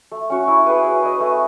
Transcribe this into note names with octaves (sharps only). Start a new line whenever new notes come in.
A3
C#4 F#4
E4
G#4 B4
E4
B4 D#5
A3